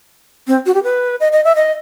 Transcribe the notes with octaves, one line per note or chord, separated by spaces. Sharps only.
C4
F#4
G4
B4
D#5
D#5
E5
D#5